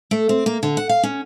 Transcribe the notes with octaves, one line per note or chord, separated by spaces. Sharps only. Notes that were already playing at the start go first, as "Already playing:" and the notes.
A3
C4
A#3
D3
F#5
F5
C#4